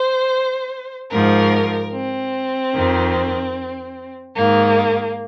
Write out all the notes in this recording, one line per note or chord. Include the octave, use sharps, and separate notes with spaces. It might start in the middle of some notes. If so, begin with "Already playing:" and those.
Already playing: C5
G#2 F3 A#4
C4
F2 D#3
G#2 D#3 A#3